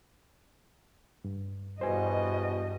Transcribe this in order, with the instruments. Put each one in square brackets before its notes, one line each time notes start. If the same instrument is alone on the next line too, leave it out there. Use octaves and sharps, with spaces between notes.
[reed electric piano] G2
[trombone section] E2 B2 [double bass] G2 [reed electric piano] C5 G#5 [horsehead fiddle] D#5